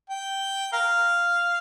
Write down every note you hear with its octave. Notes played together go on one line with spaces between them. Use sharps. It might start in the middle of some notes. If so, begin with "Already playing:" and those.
G5
A#4 F5